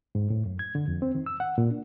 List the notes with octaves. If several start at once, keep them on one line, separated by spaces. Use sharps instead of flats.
G#2
A2
F#2
G#6
D3
F2
C4
D#3
E6
F#5
A#2
D4